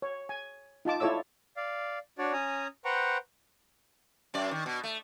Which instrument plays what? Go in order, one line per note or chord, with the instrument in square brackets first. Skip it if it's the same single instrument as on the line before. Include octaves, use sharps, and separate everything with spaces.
[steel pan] C#5
G#5
D#4 F4 A5 D6
E4 F4 A4 C#5 D5 E6
[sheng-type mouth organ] D5 F5
D4 F#4 C#5 D5
C#4 G#5 A#5 D#6
B4 C5 F#5 G5 A#5 C#6
[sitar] F#2 D5
D#3
B2
A3